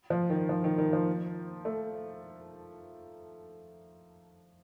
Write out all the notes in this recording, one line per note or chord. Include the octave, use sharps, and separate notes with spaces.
F3
D#3
F3
D#3
D#3
F3
A3